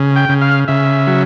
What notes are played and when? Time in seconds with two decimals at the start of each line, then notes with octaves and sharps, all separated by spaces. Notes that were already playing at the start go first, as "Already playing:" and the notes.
Already playing: C#3
0.16 G5
0.29 C#3
0.41 F5
0.68 C#3 E5
1.07 F#3